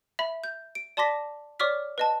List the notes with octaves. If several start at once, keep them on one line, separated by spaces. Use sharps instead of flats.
E5 B5
G6
D7
D5 A5 C6 D6 A#6 B6
C#5 D5 C#6 D6 F6 B6
B4 D#5 A5